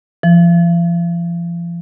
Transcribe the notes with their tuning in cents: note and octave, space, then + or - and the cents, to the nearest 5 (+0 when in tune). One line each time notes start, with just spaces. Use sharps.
F3 -40